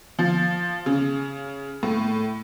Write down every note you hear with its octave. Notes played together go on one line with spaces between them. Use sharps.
F3
C#3
A2